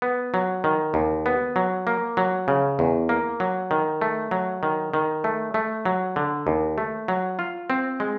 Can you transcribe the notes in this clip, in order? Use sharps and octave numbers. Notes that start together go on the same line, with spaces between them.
B3
F#3
D#3
D#2
B3
F#3
A#3
F#3
C#3
E2
A#3
F#3
D#3
A3
F#3
D#3
D#3
A3
A3
F#3
D3
D#2
A3
F#3
F4
C4
G#3